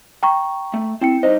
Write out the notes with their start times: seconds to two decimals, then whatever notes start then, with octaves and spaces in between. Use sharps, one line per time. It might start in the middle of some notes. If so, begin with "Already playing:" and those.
0.23 G5 A#5 C#6
0.74 A3
1.01 C4 E4 G5 C#7
1.23 G3 D#4 C5 D#5